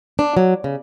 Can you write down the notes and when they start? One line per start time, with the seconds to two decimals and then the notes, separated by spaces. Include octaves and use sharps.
0.19 D4
0.37 F#3
0.64 C#3